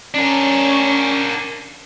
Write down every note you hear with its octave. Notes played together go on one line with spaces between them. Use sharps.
C#4 D4 A#4